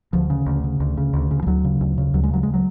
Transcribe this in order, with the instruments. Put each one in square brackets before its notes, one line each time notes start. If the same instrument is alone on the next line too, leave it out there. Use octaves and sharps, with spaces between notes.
[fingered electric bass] D2 F3
C#3
D2
C#3
D2
C#3
D2
C#3
F3
D2 F#3
C#3
D2
C#3
D2 F#3
G#3
C#3 F#3
G#3
F#3